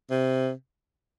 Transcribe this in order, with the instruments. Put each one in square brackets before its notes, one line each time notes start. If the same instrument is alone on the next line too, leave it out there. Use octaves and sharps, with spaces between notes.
[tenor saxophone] C3